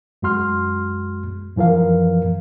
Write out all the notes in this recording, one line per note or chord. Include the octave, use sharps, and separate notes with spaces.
F#2 G#3 F#4 C6 F6
F#2 E3 F3 A#4 F5